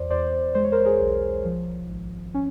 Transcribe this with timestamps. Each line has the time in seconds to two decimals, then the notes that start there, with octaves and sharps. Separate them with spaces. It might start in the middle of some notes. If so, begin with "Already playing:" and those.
Already playing: E2 C5 D5
0.10 E2 C5 D5
0.55 G#3 C5
0.64 C#5
0.72 A#4 C5
0.85 G#4 A#4
1.00 B1
1.45 F3
1.89 G#1
2.34 C#4